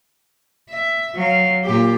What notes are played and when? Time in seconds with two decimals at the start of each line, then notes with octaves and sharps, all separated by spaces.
0.70 E5
1.15 F#3 F5
1.64 A#2 G4